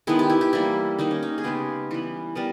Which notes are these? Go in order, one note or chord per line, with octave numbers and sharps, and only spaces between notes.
D#3 G#3 B3 E4
G4
E4
G4
E3 G3 A#3 E4
D#3 A#3 D#4
C#4
D#4
G#4
C#3 G#3 B3 G4
E3 G3 B3
G3 B3 A#4